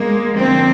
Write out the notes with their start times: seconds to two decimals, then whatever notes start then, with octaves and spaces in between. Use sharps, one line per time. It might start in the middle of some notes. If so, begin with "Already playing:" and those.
Already playing: G#3 A#3
0.37 F2 D3 F3 A#3 C4